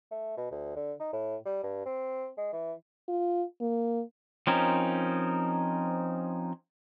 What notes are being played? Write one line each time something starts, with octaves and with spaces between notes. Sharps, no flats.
A3
B2
D2
D3
D#4
A2
G3
G2
C4
G#3
E3
F4
A#3
F3 C4 C#4 D#4 A#4